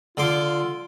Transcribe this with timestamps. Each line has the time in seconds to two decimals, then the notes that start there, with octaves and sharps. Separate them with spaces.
0.17 D3 F4 C6 D6